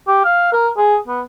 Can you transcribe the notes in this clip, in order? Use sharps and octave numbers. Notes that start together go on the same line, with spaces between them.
G4
F5
A#4
G#4
B3